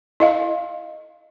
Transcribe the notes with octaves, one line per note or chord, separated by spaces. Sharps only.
E4 D#5 F5